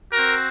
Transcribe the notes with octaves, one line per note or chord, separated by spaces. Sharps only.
F#4 A#4
C4